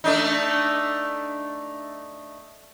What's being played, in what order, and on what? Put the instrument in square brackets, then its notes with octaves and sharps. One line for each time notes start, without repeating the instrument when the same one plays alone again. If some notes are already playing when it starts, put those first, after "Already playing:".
[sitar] A3 D4 D#4